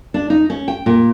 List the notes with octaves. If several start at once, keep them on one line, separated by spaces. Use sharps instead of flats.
D4
D#4
C#4
G5
A#2